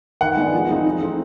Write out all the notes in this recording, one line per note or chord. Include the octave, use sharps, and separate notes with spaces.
D#3 F#5
G#3 B3 D4
F3
G#3 C4 D#4
E3
A3 C4 D#4